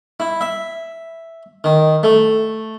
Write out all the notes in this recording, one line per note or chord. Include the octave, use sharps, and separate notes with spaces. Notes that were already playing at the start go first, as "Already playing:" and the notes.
E4
E5
D#3
A3